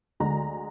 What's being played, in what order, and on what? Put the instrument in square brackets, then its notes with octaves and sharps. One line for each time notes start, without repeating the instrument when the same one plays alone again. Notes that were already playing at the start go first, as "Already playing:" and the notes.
[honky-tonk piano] D2 D3 G#3 A#5